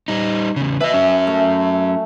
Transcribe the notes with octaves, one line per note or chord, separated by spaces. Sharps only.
G3 D#4
E2 C#3
B4 D#5 E5 G#5 A5
F#3 C#4
A3